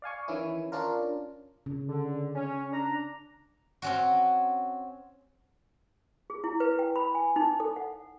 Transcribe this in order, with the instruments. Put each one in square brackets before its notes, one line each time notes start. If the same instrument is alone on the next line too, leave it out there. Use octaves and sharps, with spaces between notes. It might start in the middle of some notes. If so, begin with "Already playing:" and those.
[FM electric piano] D5 F5 G#5 C#6
D#3 E3 C#4 E4
C#4 D4 F4 A#4
[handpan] C#3
[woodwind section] D3
C#4
D4 A#5
[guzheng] C4 C#4 F#4
[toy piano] G#4
E4
B4
G5
B5
G#5
D#4
A4
F#5